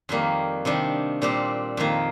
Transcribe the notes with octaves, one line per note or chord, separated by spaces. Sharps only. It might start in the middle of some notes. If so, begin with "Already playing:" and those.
F2 D#3 G3 A#3
C3 D#3 G3 D4
A#2 G3 C4 G4
F2 D#3 A#3